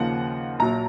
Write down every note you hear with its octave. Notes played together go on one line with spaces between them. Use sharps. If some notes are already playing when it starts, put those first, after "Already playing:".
Already playing: D#2 C#3 F3 A#3 F#5
A#1 A#2 F#3 A#5